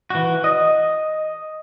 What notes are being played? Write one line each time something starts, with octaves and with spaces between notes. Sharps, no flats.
E3 F#4
D#5